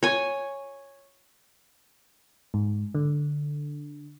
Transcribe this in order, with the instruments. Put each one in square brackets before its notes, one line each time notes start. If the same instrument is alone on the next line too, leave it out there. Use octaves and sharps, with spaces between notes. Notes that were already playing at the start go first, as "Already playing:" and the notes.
[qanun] C#5 G#5
[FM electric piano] G#2
D3